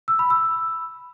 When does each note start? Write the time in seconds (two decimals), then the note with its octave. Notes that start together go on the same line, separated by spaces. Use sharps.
0.08 E6
0.19 B5
0.30 E6